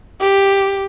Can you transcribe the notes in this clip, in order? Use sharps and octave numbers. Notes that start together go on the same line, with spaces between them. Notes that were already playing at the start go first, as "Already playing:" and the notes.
G4